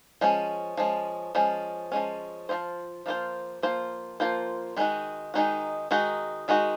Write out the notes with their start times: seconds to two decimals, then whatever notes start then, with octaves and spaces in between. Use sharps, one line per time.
0.21 F3 G#3 C#4
0.77 F3 G#3 C#4
1.35 F3 G#3 C#4
1.92 F3 G#3 C#4
2.49 F3 A#3 F4 C5
3.06 F3 A#3 F4 C5
3.63 F3 A#3 F4 C5
4.20 F3 A#3 F4 C5
4.77 D#3 G#3 D#4 F#4
5.34 D#3 G#3 D#4 F#4
5.91 D#3 G#3 D#4 F#4
6.48 D#3 G#3 D#4 F#4